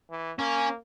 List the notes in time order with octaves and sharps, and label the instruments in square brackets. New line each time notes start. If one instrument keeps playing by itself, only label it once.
[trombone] E3
[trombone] A#3 [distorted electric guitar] C#4